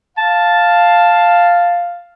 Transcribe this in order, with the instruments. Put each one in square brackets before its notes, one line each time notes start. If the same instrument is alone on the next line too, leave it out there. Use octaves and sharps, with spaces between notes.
[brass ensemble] F5 [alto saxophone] A5